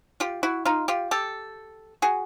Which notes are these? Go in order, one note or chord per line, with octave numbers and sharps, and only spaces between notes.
F4 G4
E4 F#4
D#4 F4
F4 G4
G4 A4
F#4 G#4